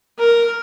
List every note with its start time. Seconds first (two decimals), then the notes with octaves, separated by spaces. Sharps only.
0.18 A#4